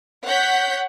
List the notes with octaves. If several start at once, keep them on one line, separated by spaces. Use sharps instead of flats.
C#5 F#5 G6 B6